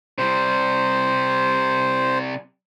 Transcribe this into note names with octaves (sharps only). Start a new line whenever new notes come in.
C3 G3 C5